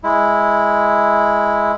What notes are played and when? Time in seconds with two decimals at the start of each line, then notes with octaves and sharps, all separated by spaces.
0.04 G#3 E4